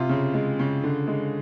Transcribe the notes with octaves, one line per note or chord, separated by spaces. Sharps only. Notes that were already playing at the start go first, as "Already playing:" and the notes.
Already playing: C3 F4
C#3
G#3
C#3
D3
G#3